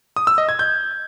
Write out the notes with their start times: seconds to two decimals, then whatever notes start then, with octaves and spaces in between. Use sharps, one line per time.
0.16 D#6
0.27 E6
0.38 D#5
0.49 G#6
0.59 G6